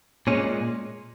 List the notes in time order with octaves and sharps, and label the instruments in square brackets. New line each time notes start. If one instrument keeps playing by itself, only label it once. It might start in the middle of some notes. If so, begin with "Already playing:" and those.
[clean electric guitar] A#2 G#3 C#4